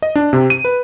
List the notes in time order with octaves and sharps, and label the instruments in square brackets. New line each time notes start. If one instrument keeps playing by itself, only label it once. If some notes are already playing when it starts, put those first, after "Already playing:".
[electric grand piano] D#5
D4
C3
D#7
B4